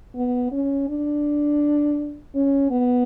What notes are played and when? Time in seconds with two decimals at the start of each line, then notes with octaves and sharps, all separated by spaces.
0.15 B3
0.52 C#4
0.89 D4
2.35 C#4
2.71 B3